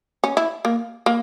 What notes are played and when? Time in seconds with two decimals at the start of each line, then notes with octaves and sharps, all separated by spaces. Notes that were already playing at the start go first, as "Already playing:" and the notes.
0.24 C#4
0.37 E4
0.65 A#3
1.06 A#3